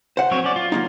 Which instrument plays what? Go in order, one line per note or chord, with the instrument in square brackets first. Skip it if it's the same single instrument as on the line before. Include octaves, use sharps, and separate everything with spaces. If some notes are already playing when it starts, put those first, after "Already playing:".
[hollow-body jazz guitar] C5 F#5
[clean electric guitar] F#3 C4 C#5
C#4 D5
F4
[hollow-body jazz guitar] F#3 A#3 D#4